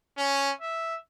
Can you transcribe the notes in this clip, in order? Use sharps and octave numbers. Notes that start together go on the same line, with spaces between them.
C#4
E5